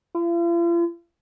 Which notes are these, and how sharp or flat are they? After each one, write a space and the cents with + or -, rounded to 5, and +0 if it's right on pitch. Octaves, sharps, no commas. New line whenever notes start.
F4 -45